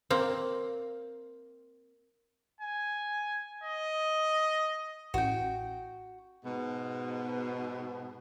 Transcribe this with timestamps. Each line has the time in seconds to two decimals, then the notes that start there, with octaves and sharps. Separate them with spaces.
0.10 A#3 C4
2.61 G#5
3.64 D#5
5.14 A1 F#4 G5
6.45 G#2 B2